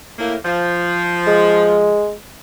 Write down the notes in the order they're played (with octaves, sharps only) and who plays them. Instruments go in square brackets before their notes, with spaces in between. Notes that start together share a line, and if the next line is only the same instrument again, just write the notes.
[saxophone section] A2 A#3
F3
[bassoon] G#3